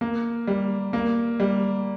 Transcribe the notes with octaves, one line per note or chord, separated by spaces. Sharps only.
A#3
G3
A#3
G3